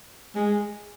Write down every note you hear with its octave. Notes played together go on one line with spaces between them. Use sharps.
G#3